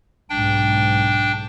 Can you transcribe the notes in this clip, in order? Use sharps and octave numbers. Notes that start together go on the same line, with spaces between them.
B1 G#2 D4 G5